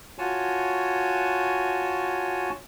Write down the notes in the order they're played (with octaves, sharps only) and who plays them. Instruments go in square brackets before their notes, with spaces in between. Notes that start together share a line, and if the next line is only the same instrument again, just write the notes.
[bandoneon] F4 F#4 C#5 G#5 A5